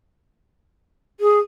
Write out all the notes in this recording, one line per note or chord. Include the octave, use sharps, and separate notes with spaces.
G#4